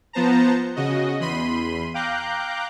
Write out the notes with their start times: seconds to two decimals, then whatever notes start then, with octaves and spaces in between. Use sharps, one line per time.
0.13 F3 B3 C5 A5 A#5
0.76 C#3 F#4 D#5
1.20 E2 B5 C6 D#7
1.94 F5 G5 A#5 D6 F#6 G6